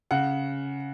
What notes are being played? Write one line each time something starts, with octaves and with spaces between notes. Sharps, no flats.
C#3 F#5